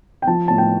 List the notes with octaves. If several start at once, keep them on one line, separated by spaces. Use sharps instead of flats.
G5
F3 A5
A2 A5
G5